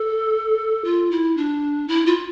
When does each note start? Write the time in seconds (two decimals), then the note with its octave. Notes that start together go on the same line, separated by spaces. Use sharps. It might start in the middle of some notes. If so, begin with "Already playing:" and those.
Already playing: A4
0.85 F4
1.11 E4
1.37 D4
1.88 E4
2.06 F4